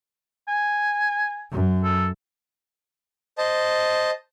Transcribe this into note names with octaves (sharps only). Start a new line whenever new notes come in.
G#5
F#2
A4
C5 D#5 A5